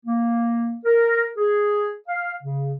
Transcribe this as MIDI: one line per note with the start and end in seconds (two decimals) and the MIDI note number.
0.06 0.75 58
0.85 1.27 70
1.37 1.94 68
2.08 2.35 77
2.43 2.76 49